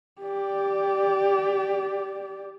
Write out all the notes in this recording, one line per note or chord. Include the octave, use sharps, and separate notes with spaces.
G4 D5